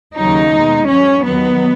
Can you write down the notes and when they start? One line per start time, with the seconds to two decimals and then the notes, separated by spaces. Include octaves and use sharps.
0.17 D#2 C#3 F#3 D#4
0.52 B2 G#3
0.87 G#2 F#3 C#4
1.23 D#2 D#3 F#3 B3